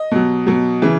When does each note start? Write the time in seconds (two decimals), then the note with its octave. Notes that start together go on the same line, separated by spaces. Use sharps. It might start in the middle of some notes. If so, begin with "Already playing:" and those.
Already playing: D#5
0.11 B2 F#3
0.47 B2 F#3
0.82 C#3 E3